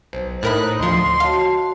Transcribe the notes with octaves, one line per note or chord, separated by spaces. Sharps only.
B1 C5
A2 D#4 A#4 B5 F#6
D2 F3 D#5 C6
F#4 C#5 F5 A5